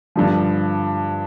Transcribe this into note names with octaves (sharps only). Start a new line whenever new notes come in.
G2 D3 F3